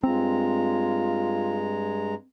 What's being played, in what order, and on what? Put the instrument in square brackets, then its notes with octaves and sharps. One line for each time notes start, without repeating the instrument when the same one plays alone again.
[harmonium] G2 G#3 A#5 [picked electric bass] C4 [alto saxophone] F4